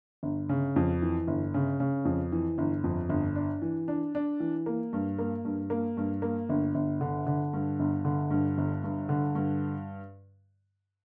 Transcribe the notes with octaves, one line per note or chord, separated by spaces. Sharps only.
G1
C#3
F2
E3
G1
C#3
C#3
F2
E3
G1
F2
G1
D4
E3
D4
D4
E3
A#3
G2
A#3
G2
A#3
G2
A#3
G1
G1
D3
D3
G2
G1
D3
G2
G1
G2
D3
G2